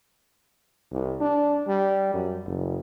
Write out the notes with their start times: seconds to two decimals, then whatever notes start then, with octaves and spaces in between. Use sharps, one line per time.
0.92 C2
1.21 D4
1.68 G3
2.14 F#2
2.46 F#1